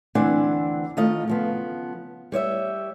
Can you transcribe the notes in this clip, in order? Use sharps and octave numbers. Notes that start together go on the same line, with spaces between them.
D2 E3 C4 D4 F#5 G#5
D#3 A3 F4 D#5
C#3 F3 B3
G3 C#5 D5 E5